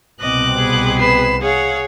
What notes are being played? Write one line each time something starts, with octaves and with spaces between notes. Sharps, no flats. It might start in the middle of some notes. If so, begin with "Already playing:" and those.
C2 B2 C4 D#5 D6 F#6
B3 G#4
B4 C7 E7
G#4 C#5 F5 F#5